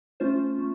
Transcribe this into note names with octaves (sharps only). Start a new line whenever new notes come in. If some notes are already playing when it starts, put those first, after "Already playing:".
A3 C#4 F4 C5
A3